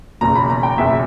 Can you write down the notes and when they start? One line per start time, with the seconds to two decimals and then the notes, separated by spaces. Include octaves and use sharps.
0.21 F#1 E2 B2 A#5
0.36 B5
0.50 A#5
0.63 G5
0.77 F#1 E2 B2 E5